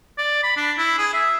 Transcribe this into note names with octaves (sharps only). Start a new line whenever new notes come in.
D5
B5
D4
E4
G#4
E5